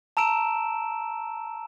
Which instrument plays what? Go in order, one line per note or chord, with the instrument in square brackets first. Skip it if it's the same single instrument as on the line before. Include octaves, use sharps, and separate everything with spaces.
[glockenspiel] A5 A#5 E6 D7 E7